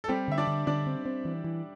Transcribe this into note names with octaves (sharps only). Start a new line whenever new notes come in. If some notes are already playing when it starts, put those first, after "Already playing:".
A4
G3 C4 G4
D3 E5
D4 D5
D3
D3 D4 D5
C4
C4
E3
E3